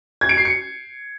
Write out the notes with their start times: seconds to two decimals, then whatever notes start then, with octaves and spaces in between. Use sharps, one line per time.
0.21 G#6
0.29 D7
0.37 C7
0.45 C#7